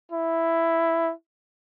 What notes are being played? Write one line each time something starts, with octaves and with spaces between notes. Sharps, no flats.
E4